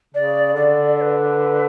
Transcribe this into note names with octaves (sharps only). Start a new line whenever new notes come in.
C#3 D5
D3 D5
D5
B4